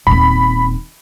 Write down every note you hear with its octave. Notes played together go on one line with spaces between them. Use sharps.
D#1 C4 B5